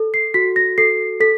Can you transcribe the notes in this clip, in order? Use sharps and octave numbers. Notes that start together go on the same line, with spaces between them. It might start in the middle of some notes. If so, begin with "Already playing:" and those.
Already playing: A4
C7
F#4 B6
A#6
A4 C7
A4 B6